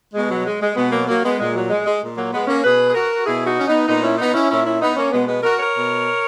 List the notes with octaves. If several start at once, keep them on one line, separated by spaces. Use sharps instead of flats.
B2 G#3
F#3
G#3
G#3
B2 G#3 B3
F#3 A#3
F#3 A#3
G#3 B3
A#2 G#3
F#3
G#3
G#3
A#2
F#3 A#3
G#3 B3
A#3 C#4
B2 G#4 B4
G#4
F#4 A#4
B2 E4 G#4
D#4 F#4
C#4
B3 D#4
A#2 B3 D#4
C#4 E4
B3 D#4
C#4 E4
A#2 C#4 E4
C#4 E4
B3 D#4
A#3 C#4
B2 G#3 B3
G#3 B3
F#4 A#4
A#4 C#5
B2